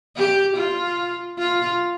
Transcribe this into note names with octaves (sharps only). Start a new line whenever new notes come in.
G4
F4
F4